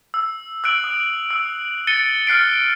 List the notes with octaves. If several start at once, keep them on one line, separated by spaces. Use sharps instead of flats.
E6
E6 F#6 D7 F#7
D#6
E6
A6 C#7 D#7 G7
F6 F#6 C7 D7